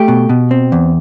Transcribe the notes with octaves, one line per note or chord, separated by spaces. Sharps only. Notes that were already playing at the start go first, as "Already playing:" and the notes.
Already playing: A3 G4
B2
B2
C4
E2